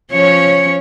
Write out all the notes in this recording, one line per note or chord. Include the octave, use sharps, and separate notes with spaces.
F3 C#4 C#5 C#7